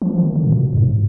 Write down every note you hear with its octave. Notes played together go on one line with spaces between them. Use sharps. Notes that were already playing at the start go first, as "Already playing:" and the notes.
F3
D#3
D3
A#2
B2
F#2
G#2